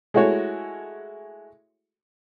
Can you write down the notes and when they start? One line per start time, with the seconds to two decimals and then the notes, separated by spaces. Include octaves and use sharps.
0.14 G#3 A3 E4 F#4 C#5